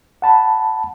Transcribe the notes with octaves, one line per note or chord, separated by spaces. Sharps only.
F#5 A5 B5